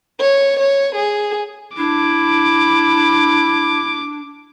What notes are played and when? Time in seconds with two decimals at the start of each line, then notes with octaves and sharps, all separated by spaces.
0.20 C#5
0.59 C#5
0.95 G#4
1.77 D4 E4 D6